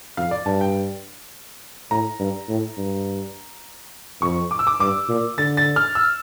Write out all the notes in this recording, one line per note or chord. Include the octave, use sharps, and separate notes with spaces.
F2 F5
D5
G2 A5
G5
A2 A#5
G2
A2
G2
F2 C#6
D6
E6
D6
G2 D6
A#2
D3 A6
A6
F6
E6